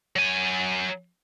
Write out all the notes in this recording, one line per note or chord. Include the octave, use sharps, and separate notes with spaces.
F#3 G#5